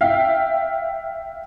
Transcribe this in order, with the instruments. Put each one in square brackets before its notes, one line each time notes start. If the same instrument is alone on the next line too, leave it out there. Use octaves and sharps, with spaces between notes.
[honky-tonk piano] E5 F5 G5